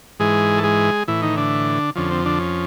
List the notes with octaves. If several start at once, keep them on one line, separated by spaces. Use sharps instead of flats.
G#2 E3 G#3 G#4
A4
G#3 G#4
A2 E3 E4
D#3 D#4
D3 D4
F2 D3 F3 C#4
C4
D3 D4
C#4